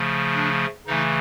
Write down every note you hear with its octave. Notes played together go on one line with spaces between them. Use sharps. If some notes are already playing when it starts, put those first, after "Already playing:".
Already playing: C#3 F3 A3
D4
C#3 E3 A3 D#4